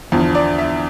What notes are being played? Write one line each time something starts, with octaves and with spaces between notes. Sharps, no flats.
E2 D3 F3
D5
E5